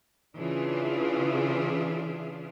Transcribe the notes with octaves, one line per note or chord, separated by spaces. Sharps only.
C#3 E3 D4 F4 G#4 E5